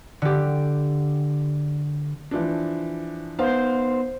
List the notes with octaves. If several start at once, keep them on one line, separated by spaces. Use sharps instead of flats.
D3 G4
E3 F3 D4
B3 D#4 C5 F5